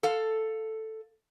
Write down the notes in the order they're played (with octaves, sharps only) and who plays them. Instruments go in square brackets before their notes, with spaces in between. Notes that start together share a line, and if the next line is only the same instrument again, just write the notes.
[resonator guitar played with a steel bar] A4 F5